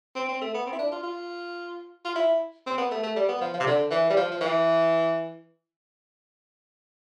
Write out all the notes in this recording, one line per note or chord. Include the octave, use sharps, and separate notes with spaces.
C4
C4
A3
B3
C4
E4
D4
F4
F4
F4
E4
C4
B3
A3
A3
G3
B3
F3
F3
C3
D3
E3
G3
F3
F3
E3